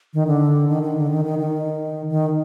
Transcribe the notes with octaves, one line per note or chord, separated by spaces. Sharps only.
D#3
D3
D#3
D#3
D3
D#3
D#3
D#3
D#3